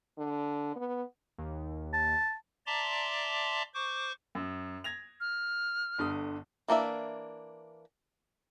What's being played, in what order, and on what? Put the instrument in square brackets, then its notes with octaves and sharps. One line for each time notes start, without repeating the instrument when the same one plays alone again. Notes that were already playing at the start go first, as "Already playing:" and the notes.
[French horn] D3
B3
[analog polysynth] D#2
[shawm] A5
[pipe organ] D5 E5 A5 A#5 C6 D6
C5 C#6 D6
[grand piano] F#2
G#6 A#6 F7
[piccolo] F6
[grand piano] G1 D3 D#6
[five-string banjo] E3 A#3 D4 E5